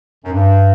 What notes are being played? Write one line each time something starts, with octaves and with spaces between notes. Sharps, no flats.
F#2
G2